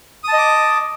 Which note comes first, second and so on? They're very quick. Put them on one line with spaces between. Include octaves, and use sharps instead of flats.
D#6 A5 D#5 D6